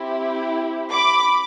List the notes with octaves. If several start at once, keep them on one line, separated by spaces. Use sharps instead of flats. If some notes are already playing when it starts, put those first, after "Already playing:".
Already playing: C4 E4 G4
B5 D6